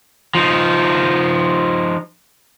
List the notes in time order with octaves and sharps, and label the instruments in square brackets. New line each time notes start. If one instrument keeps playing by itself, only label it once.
[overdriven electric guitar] F3 D#4